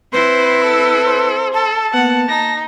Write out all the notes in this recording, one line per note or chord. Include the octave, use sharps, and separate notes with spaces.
C4 E4 B4 C5 C6
A4 E6
C5
A4 A5
A#3 B3 F#5
D#4 A#6